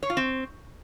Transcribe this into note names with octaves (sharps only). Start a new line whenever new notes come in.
C#5
F4
C4